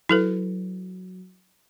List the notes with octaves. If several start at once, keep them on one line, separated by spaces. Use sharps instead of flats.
F#3 E4 A4 B4